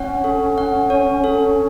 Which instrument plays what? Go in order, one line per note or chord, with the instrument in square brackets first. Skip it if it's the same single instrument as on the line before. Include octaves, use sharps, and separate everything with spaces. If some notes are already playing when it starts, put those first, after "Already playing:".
Already playing: [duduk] C#4 [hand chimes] C#5 F#5
[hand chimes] A4
F#5
C#5
A4